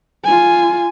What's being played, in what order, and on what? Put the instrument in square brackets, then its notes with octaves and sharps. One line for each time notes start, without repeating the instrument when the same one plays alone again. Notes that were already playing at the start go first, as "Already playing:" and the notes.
[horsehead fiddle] F4 G#5